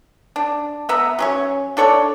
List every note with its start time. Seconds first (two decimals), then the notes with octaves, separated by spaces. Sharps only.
0.36 D4
0.89 B3 E5 A#5
1.19 F#3 C#4 C#5
1.77 D4 A4 C#5 D5